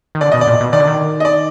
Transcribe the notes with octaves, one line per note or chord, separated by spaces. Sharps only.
D#3
D3 D5
B2 D#5
D5
A#2
B2
D#3 D5
D3
D#3
D#5
D5